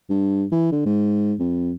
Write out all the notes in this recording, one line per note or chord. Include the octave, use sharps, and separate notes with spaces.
G2
E3
D3
G#2
F2